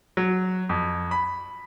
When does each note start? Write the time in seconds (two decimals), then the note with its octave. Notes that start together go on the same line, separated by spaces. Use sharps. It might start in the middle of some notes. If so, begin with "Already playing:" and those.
0.17 F#3
0.69 F2
1.11 B5